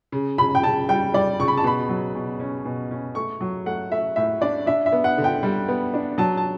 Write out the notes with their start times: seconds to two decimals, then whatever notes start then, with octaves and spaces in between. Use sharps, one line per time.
0.12 C#3
0.38 C#3 B5
0.55 G5
0.63 C#3 A5
0.89 G3 G5
1.14 G3 D5
1.40 C#3 C#6
1.48 B5
1.57 A5
1.64 B2 B5
1.89 F#3
2.15 B2
2.40 C#4
2.66 B2
2.91 C#4
3.15 A3 C#6
3.41 F#3
3.66 A3 F#5
3.92 A3 E5
4.16 A2 E5
4.41 D4 D5
4.66 D4 E5
4.86 E5
4.92 B3
5.04 F#5
5.18 D3
5.24 G5
5.43 G3
5.68 B3
5.94 D4
6.18 F#3 A5
6.37 A5